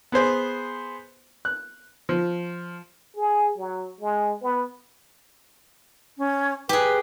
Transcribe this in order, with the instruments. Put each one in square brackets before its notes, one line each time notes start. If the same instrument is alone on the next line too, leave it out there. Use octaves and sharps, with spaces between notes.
[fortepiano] B3 G#4 C5 G#5
F#6
F3
[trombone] G#4
F#3
G#3
B3
[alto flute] C#4
[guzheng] G4 G#4 [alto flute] B4